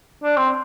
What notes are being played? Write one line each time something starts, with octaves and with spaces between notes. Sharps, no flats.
D4
C4